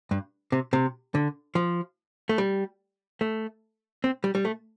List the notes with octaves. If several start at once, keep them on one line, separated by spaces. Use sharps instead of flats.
G2
C3
C3
D3
F3
A3
G3
A3
C4
G3
G3
A3